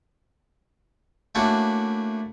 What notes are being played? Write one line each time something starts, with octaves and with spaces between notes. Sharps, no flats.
A3 A#3 C#4 D4 E4 F#4